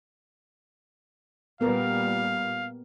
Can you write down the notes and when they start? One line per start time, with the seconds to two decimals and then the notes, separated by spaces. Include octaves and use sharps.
1.61 A#2 G3 B3 A#4 F5